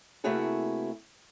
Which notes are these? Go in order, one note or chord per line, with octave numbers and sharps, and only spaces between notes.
C3 A3 A#3 E4 F#4 G#4